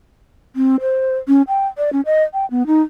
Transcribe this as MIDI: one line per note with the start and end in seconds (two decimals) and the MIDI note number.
0.56 0.76 60
0.81 1.17 72
1.28 1.42 61
1.48 1.67 79
1.78 1.92 74
1.93 2.01 61
2.06 2.23 75
2.33 2.46 79
2.51 2.66 59
2.67 2.82 63